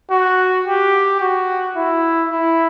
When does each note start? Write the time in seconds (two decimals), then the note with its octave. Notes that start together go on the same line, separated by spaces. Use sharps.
0.10 F#4
0.66 G4
1.20 F#4
1.76 E4
2.31 E4